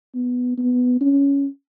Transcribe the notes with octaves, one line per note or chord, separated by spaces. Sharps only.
B3
B3
C#4